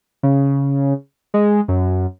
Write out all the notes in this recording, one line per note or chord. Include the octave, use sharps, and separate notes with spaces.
C#3
G#3
F#2